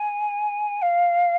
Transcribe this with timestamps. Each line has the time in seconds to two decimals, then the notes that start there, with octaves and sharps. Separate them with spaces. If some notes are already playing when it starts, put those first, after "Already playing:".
Already playing: G#5
0.82 F5